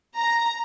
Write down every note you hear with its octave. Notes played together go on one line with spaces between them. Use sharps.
A#5